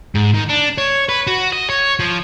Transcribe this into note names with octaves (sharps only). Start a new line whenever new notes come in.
G#2
D#3
D4
C#5
B4
F#4
D#5
C#5
F3